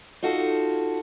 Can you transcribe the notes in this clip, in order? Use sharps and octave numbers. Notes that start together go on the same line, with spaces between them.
D#4 F4 F#4 A4